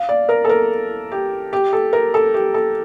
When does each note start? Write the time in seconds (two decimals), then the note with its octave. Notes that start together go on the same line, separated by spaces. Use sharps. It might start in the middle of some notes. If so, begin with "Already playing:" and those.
Already playing: F5
0.09 D5
0.29 A#4
0.45 A4
0.49 A#4
1.12 G4
1.53 G4
1.73 A4
1.93 A#4
2.14 A4
2.34 G4
2.54 A4